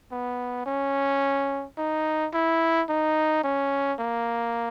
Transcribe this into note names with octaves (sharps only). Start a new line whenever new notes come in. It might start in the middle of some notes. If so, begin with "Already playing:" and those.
B3
C#4
D#4
E4
D#4
C#4
A#3